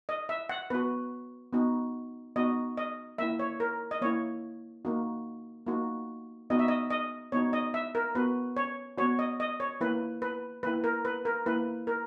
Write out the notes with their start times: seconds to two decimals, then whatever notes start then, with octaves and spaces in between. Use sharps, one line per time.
0.09 D#5
0.29 E5
0.49 F#5
0.70 B3 F#4 B4
1.53 B3 D#4 F#4
2.36 B3 D#4 F#4 D#5
2.77 D#5
3.18 A#3 E4 E5
3.39 C#5
3.60 A#4
3.91 D#5
4.01 A#3 E4 C#5
4.85 A#3 D#4 F#4
5.66 A#3 D#4 F#4
6.50 B3 D#4 F#4 D#5
6.59 E5
6.68 D#5
6.90 D#5
7.32 B3 D#4 F#4 C#5
7.53 D#5
7.74 E5
7.95 A#4
8.15 B3 F#4 B4
8.57 C#5
8.98 B3 F#4 C#5
9.19 D#5
9.40 D#5
9.60 C#5
9.81 A#3 E4 B4
10.22 B4
10.63 A#3 E4 B4
10.84 A#4
11.05 B4
11.25 A#4
11.46 A#3 E4 B4
11.87 A#4